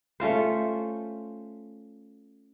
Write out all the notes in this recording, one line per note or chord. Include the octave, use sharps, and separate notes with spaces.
A3 C#4 F4 C5